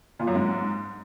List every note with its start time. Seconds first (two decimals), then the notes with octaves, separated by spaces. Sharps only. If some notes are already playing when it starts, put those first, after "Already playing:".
0.19 A#2
0.27 F#2
0.35 G#2